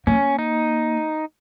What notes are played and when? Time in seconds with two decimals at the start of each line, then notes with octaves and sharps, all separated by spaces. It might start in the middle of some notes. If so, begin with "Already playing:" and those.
0.07 A#3 C#4
0.39 D#4